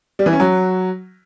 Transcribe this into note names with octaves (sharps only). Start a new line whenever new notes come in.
G3
E3
C#4
F#3